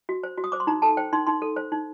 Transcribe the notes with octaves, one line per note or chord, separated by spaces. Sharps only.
F#4
C5
F#4
D#6
C5 D6
C6
D#4 A#5
A4 A5
C5 G5
D#4 C6
D#4 C6
A4
C5
D#4